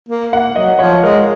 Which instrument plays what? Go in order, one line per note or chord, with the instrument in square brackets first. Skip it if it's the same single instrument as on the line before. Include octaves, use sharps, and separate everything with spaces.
[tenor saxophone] A#3
[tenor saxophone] A#3 [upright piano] F#5
[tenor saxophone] F#3 [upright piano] D#5
[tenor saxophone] F3 [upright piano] C#5
[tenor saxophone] G#3 [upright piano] A#4